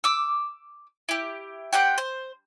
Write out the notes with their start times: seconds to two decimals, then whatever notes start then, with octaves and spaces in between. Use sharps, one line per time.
0.04 D6 E6
1.09 E4 G4
1.73 C4 G4 F#5 G5
1.98 C5